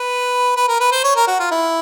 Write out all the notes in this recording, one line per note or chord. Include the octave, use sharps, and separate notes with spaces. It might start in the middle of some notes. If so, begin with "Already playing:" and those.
Already playing: B4
B4
A#4
B4
C5
C#5
A#4
F#4
F4
E4